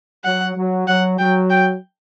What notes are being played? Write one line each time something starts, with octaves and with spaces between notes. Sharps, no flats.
F#3 F#5
F#3
F#3 F#5
F#3 G5
G5